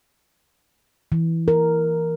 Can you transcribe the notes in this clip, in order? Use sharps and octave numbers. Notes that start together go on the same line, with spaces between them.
E3
A#4